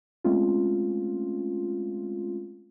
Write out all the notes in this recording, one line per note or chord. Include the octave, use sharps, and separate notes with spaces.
G#3 A3 C4 C#4 F4